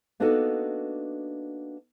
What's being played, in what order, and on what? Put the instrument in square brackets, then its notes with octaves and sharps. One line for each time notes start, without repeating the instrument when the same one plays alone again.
[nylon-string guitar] A#3 B3 D4 D#4 F#4 A4